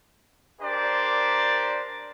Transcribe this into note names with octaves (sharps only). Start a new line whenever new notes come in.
D4 G4 A#4 C5 D5